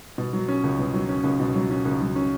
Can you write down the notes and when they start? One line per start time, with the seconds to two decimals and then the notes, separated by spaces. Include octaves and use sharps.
0.18 B2
0.33 F#3
0.48 C#4
0.64 C#2
0.79 B2
0.94 F#3
1.09 C#4
1.24 C#2
1.40 B2
1.55 F#3
1.70 C#4
1.85 C#2
2.01 F#3
2.15 C#4